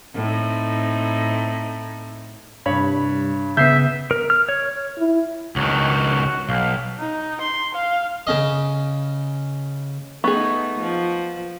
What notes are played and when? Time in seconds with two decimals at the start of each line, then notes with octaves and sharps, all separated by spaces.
0.15 A2 C4 D#4
2.66 C2 G2 C#5 B5
3.57 C#3 B3 E5 G6 C7
4.11 A#4
4.30 F6
4.49 C#5
4.98 E4
5.56 C#2 D#3 F#4
6.49 B1 F5
6.98 D#4
7.41 C6
7.75 F5
8.27 C#3 C#4 D#5
10.24 A3 B3 D#4 G#4 C#6
10.80 F3